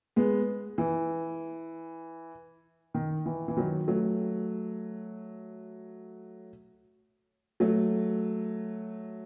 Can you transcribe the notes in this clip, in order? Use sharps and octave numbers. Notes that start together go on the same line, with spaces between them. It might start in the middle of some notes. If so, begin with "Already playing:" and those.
G#3 B3
E3
D#3
E3
E3
D#3 F#3
F#3 A3
F#3 A3